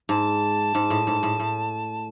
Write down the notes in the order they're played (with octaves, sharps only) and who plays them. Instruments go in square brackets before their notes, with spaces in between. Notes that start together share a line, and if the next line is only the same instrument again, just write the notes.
[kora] G#2 [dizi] A5
[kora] G#2
A2
G#2
A2
A2